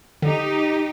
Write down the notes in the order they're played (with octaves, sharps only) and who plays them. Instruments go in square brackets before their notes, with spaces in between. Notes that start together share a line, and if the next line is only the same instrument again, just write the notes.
[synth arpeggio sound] D3 [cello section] D#4 G4